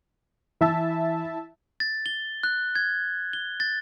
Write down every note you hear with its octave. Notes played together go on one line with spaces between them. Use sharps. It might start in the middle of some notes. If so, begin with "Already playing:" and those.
E3 E4 E5 A5 E6
A6
G7
F#6
G#6
G7
A6